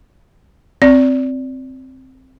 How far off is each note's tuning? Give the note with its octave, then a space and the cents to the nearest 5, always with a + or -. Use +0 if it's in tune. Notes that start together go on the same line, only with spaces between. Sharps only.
C4 +0 D5 -20